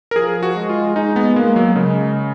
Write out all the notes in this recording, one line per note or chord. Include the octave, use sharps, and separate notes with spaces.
A#4
F3 G#4
F#4
G#3
F4
G#3 D#4
B3
G#3 A#3
F#3
C#3 G#3